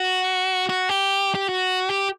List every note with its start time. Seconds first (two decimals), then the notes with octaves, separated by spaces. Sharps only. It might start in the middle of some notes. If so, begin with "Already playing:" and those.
Already playing: F#4
0.69 F#4
0.89 G4
1.35 G4
1.49 F#4
1.89 G4